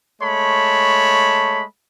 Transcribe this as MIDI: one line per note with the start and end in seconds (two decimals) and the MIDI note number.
0.21 1.63 56
0.21 1.63 57
0.21 1.63 73
0.21 1.63 81
0.21 1.63 83